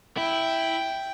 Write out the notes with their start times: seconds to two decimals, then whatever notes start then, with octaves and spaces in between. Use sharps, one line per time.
0.18 E4 G5